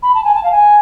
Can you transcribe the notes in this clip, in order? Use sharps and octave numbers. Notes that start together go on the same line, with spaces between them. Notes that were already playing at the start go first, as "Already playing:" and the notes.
B5
A5
G#5
A5
F5
G#5